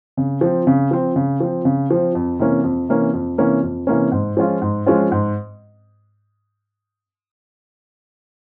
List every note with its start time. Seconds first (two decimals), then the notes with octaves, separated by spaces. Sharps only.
0.17 C#3
0.41 F3 C4
0.67 C#3
0.91 F3 C4
1.16 C#3
1.40 F3 C4
1.65 C#3
1.91 F3 C4
2.15 F2
2.39 C3 E3 A#3 C#4
2.64 F2
2.89 C3 E3 A#3 C#4
3.14 F2
3.38 C3 E3 A#3 C#4
3.63 F2
3.87 C3 E3 A#3 C#4
4.12 G#2
4.37 F3 G#3 C#4 F4
4.62 G#2
4.86 F3 G#3 C#4 F4
5.12 G#2